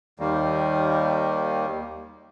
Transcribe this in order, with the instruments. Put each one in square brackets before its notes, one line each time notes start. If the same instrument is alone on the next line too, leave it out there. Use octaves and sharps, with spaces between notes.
[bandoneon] D#2 D#3 G3 A#3